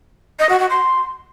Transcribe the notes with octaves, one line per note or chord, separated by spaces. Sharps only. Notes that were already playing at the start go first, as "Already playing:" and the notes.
D#5
F#4
F#4
C6